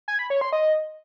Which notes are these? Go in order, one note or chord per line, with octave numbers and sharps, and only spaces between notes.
G#5
B5
C#5
C6
D#5